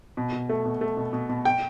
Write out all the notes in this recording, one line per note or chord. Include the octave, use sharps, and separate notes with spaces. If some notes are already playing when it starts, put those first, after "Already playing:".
B2
B2
A3
B2
A3
B2
B2
B2
G5